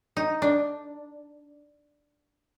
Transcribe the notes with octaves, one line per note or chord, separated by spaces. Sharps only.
D#4
D4